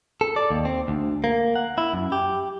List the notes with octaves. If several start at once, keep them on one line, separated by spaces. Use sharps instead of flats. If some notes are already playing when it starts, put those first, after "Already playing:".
A4
D5
D#2
C4
D2
A#3
F#5
E4
F#2
G4